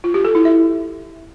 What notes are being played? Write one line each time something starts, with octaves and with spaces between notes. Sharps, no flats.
F4
G4
A4
E4
E5